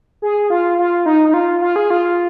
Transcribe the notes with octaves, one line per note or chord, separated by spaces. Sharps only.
G#4
F4
F4
D#4
D#4
F4
F4
G#4
F4